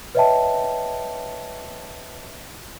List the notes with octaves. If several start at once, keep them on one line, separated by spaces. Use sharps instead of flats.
B4 C#5 D#5 E5 G5 A5